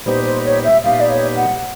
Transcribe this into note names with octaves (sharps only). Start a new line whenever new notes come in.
A#2 G3 B3 D#4 G4 C5
C5
C#5
E5
A#2 G3 B3 D#4 G4 F5
D5
C#5
F#5